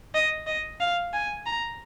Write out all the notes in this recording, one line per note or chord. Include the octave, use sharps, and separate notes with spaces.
D#5
D#5
F5
G#5
A#5